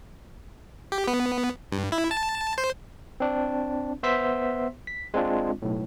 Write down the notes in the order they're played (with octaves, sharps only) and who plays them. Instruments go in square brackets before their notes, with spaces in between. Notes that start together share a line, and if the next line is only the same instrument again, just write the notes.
[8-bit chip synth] G4
B3
G2
E4
A5
C5
[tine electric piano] C4 D4
B3 C5 E5 C6 E6 B6
B6
G#3 C4 D4 F4
B1 A2